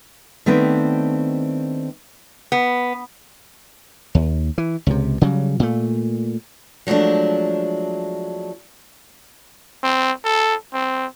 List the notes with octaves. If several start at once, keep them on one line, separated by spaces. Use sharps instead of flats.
D#3 A3 B3 C4 D4
B3
D#2
E3
C#2 C3
C#3 F#3 G3
A#2 A3
F3 F#3 G#3 A3 D4
C4
A4
C4